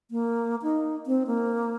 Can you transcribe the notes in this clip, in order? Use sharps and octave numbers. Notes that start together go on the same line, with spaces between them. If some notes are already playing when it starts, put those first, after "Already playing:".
A#3
D#4
C4
A#3